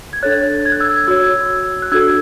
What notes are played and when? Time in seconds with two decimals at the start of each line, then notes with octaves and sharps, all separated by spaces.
0.13 G#6
0.23 D4 A4 C#5 F#6 A6
0.65 G#6
0.72 F#6
0.80 E6 G#6
1.07 F#4 C#5 E6 G#6
1.82 F#6
1.92 D4 F#4 A4 E6 G#6